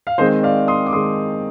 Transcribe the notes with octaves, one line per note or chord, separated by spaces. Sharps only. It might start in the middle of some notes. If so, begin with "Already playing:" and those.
F5
D#3 G#3 C4 C5 D#5
D5 F5
C6 D#6
D6
D#3 G#3 C4 C6 D#6